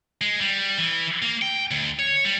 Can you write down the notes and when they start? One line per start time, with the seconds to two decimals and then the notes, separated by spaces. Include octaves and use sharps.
0.21 G#3
0.41 G3
0.78 E3
1.22 A#3
1.42 G5
1.71 D2
1.99 C#5
2.25 G3